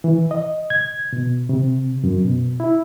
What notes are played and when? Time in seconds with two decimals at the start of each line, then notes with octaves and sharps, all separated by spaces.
0.04 E3
0.31 D#5
0.70 G#6
1.13 B2
1.49 C3
2.04 F#2
2.24 B2
2.60 E4